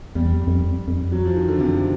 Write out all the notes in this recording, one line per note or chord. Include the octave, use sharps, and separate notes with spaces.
E2 G3
F2
F2
F2
F#3
F3
D#3
D3
F#2 C3